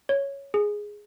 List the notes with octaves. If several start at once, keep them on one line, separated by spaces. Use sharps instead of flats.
C#5
G#4